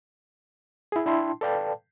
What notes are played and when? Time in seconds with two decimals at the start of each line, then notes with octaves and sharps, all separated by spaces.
0.92 E4 G#4
1.06 D4 E4 G5 A5 C6
1.41 A4 B4 D5 F5 G5 A5